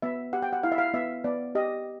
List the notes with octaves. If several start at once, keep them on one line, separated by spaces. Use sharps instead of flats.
B3 E5
G4 F#5
G5
F#5
E4 F5
E5
F5
B3 E5
B3 D5
G4 D#5